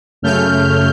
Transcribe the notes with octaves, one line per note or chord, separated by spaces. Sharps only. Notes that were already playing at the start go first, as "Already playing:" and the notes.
F#2 C#3 A3 F6 G6